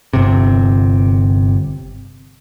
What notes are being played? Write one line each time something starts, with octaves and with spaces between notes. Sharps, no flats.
G1 C3